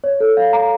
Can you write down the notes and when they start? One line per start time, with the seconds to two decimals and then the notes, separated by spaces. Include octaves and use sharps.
0.04 C#5
0.20 A4
0.37 F5
0.53 A#5